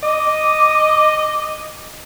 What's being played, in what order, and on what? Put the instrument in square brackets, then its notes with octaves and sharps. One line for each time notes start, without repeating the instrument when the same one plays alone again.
[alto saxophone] D#5 [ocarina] D6